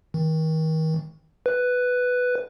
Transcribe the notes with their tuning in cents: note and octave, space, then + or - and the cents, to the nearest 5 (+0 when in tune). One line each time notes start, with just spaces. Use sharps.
D#3 +35
B4 +5